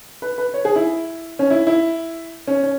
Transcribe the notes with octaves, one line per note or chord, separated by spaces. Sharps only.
B4
B4
C#5
G#4
E4
C#4
E4
E4
C#4
C#4